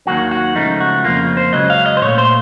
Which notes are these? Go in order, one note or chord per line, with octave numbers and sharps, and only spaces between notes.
D#2 D#3 F#3 A#3 F#4
F#4
C#2 C#3 F3 A3 D#4
F#4
F2 C#3 F3 A#3 F4
C5
C#2 C#3 F#3 D#5
F5
D#5
C5
A#2 A3 C#5
C5